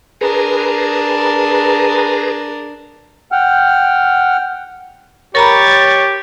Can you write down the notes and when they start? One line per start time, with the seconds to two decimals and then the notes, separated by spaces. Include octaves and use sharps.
0.21 D4 G#4 A#4 B4 A#5
3.32 F#5 G5 F6
5.35 G4 A#4 C#5 A#5 B5 A6